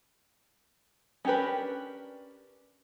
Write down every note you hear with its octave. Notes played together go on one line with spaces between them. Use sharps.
C#4 D4 G4 A#4 B4